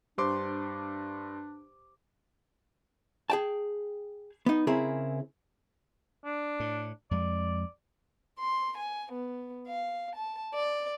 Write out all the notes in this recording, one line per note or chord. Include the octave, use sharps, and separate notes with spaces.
G2 D4 G4 C5 C6 D6
G#4 G5 A5
B3 D#4
C#3 C4 E4 G#4 A#4
D4
A2
F2 G#3 D5
C6
G#5
B3
F5
A5
D5